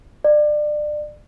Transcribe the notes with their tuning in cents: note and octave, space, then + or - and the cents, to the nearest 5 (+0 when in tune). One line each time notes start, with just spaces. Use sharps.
D5 +30